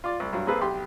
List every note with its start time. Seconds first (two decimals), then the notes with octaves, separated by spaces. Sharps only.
0.04 F4 D5
0.20 C2
0.33 G2 F#3
0.47 A#3 C4 G#4 A4 B4
0.61 B1 G4 C6